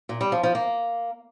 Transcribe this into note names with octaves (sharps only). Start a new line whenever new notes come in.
A#2
G3
F3
F3
A#3